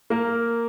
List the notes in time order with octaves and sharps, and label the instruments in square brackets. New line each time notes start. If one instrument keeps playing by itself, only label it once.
[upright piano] A#3 A#4